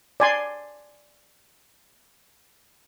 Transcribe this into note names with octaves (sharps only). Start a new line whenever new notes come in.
D5 G#5 C6